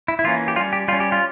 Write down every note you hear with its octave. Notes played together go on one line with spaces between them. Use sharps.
E4
E4
E3 A#3 C#4 F4
G4
G3 C#4 F4
G4
G3 C#4 F4
G4
F4